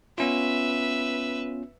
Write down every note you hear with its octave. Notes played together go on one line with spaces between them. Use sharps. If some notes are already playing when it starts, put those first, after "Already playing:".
B3 C#4 F4 B4 E5